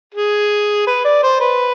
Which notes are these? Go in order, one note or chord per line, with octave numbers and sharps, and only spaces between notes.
G#4
B4
D5
C5
B4